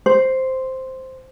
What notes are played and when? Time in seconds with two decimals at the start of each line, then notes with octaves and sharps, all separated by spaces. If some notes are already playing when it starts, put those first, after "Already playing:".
0.06 C5